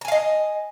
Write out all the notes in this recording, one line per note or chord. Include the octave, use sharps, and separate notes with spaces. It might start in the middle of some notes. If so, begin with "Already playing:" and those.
D#5 F5 G#5 A#5